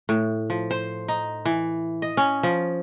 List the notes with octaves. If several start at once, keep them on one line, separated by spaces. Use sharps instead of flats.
A2
F3
C5
D#4
E3
D#5
C#4
F3